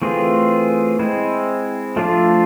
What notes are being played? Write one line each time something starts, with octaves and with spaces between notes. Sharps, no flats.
E3 A3 C4 F4 G#4
G#3 C4 E4
F3 A3 D4 F4